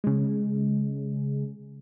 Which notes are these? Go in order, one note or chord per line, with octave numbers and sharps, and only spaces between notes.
C#3 G#3